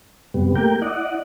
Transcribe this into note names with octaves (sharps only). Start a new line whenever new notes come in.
F#2 C3 G3 B3
A3 A#3 G4 A#4 G5
E4 D5 D#5 F#5